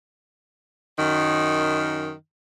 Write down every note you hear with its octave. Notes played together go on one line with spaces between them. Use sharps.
F#2 D#3